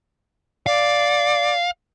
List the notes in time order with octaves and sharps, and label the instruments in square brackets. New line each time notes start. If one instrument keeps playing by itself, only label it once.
[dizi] D5 [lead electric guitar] F5